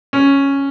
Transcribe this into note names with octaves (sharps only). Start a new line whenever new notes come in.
C#4